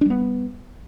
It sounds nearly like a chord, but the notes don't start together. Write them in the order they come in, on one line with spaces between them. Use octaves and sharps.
D4 G3 B3